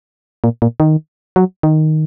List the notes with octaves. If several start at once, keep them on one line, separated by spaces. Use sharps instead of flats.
A#2
A#2
D#3
F#3
D#3